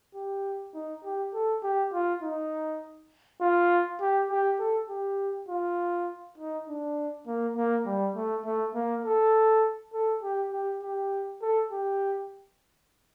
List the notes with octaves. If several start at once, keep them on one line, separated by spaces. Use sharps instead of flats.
G4
D#4
G4
A4
G4
F4
D#4
F4
G4
G4
A4
G4
F4
D#4
D4
A#3
A#3
G3
A3
A3
A#3
A4
A4
G4
G4
G4
A4
G4